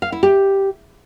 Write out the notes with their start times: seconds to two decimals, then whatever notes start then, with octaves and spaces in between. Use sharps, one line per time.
0.02 F5
0.12 E4
0.23 G4